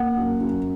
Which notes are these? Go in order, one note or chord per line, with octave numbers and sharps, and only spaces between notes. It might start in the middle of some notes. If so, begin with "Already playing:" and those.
Already playing: A#3 F#5
F#2
F#2